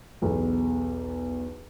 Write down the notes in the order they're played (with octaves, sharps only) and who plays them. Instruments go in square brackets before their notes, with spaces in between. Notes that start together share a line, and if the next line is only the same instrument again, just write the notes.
[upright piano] B1 E2